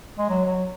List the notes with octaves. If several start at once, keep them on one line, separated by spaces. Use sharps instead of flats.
G#3
F#3
F#3